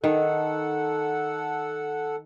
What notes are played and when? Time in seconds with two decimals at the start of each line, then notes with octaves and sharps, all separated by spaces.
0.04 D#3 A4 F#5